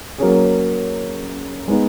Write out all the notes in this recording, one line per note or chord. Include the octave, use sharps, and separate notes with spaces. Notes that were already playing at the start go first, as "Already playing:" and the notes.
F#3 A#3 C#4 G#4
G#3 B3 D#4